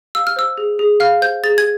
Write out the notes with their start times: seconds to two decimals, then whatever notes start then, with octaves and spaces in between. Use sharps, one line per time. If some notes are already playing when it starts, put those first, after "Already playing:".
0.15 F5 E6
0.27 F6
0.36 C5 E6
0.58 G#4
0.79 G#4
1.00 F5 F6
1.21 C5 G6
1.44 G#4 A6
1.58 G#6